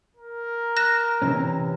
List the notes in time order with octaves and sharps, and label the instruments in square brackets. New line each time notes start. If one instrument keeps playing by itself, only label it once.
[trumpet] A#4
[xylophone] F#6 A#6 E7
[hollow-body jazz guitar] C3 E3 C#4